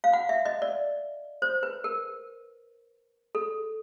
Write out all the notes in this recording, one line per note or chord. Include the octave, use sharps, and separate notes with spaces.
F5
F#5
E5
D#5
D5
C5
B4
A#4
A4